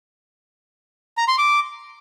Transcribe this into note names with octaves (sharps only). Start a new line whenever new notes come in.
A#5
C6
D6